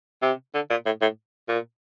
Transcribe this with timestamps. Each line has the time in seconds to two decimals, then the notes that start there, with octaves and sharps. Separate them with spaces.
0.22 C3
0.54 D3
0.70 A#2
0.86 A2
1.02 A2
1.49 A#2